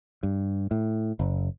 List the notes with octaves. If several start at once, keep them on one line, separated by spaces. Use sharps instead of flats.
G2
A2
F#1